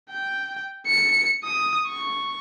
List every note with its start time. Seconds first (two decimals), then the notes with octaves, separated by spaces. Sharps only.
0.11 G5
0.87 C#7
1.44 D#6
1.88 C#6